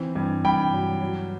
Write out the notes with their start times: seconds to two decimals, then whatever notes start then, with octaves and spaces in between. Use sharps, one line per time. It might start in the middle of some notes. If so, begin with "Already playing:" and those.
Already playing: E3 C4
0.15 G2
0.45 G2 G5 B5
0.73 F#3
1.01 F#3